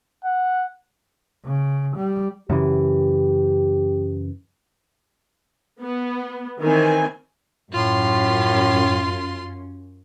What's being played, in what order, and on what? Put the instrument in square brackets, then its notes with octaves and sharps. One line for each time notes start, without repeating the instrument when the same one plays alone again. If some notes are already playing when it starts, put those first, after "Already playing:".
[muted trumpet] F#5
[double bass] C#3
G3
[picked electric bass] F#2 C#3 E3 [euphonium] G4
[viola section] B3
D#3 E3 C4 G#5
[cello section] F#2 C#4 [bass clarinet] A2 [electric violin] F4 C6